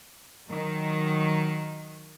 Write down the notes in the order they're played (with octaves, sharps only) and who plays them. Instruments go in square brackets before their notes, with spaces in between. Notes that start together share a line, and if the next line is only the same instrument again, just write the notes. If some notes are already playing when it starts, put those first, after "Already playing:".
[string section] D#3 F#3